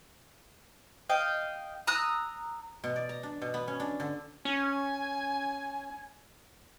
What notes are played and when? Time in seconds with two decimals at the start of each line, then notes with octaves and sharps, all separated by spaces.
1.09 D#5 F5 G5
1.87 A#5 D#6 E6 F#6
2.84 B2
2.96 D5
3.09 A#5
3.23 D4
3.42 B2
3.54 B3
3.68 C#4
3.80 D4
4.00 D3
4.45 C#4 G#5